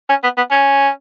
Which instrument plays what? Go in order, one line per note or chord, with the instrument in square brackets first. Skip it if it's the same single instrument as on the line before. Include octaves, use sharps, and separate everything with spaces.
[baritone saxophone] C#4
B3
B3
C#4